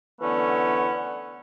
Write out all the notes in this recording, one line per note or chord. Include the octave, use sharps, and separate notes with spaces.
D3 E3 A3 B3 C#4